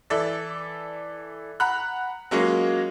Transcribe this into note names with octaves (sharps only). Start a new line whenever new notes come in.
E3 A4 D5 E5
F#5 A#5 B5 F#6
F#3 G#3 A#3 C#4 F4